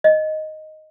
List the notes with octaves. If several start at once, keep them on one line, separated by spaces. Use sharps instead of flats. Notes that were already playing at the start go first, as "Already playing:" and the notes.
D#5